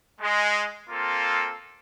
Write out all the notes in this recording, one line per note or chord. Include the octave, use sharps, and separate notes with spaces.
G#3
A#3 C4 F4 A4